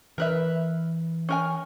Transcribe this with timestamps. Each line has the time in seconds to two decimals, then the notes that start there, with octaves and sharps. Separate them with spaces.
0.18 E3 A#4 B4 E5
1.29 C#4 A#4 G#5